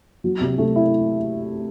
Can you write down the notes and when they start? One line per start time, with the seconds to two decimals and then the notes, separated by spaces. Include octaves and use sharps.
0.24 F#3
0.41 C3
0.58 A3
0.76 E4